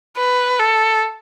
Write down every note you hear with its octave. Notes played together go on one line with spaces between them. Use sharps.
B4
A4